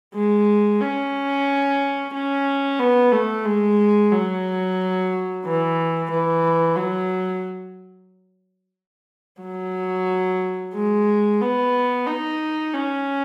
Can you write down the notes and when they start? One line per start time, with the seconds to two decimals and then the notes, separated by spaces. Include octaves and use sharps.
0.15 G#3
0.81 C#4
2.14 C#4
2.79 B3
3.13 A3
3.46 G#3
4.13 F#3
5.45 E3
6.11 E3
6.77 F#3
9.42 F#3
10.75 G#3
11.41 B3
12.07 D#4
12.74 C#4